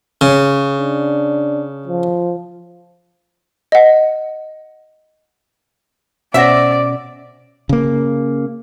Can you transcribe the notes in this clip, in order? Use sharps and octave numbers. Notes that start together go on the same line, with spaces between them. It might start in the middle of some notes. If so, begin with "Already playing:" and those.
C#3
D4
F3
D#5 F#5
B2 C#4 C5 D5 E5 F#5 E6 A#6
C#3 A#3